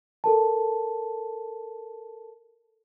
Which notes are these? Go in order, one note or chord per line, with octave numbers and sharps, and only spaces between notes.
A4 A#4 A5